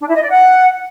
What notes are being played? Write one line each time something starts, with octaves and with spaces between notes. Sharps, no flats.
D4
E4
D#5
D5
F#5